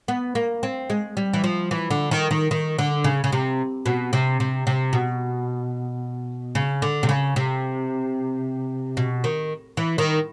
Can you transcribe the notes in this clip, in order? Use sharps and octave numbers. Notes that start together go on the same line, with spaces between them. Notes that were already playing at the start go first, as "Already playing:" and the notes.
B3
A#3
C4
G#3
G3
E3
F3
E3
D3
D#3
D#3
D#3
D3
C#3
C#3
C3
B2
C3
C3
C3
B2
C#3
D3
C3
C#3
C3
B2
D#3
E3
D#3